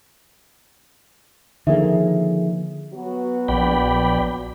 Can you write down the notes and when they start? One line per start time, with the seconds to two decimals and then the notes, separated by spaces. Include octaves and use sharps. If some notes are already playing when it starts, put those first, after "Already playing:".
1.67 D3 D#3 F3 A#3 G#4 E5
2.94 F#3 B3 F#4
3.48 A#1 D5 G5 B5